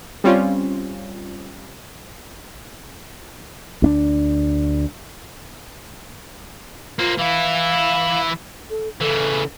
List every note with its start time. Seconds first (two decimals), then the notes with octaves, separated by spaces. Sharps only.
0.24 G3 C4 C#4 F4
3.82 D2 C#4 D4
6.99 A#3 C4 F4
7.18 E3 E4 F5
8.70 A4
9.01 C#3 E3 A4